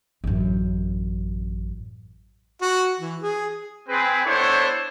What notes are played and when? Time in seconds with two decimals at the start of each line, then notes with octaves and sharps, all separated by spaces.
0.24 A1 F#2
2.62 F#4
3.00 E3
3.22 G#4
3.88 C4 G#4 B4
4.25 B3 D4 E4 A4 C5 C#5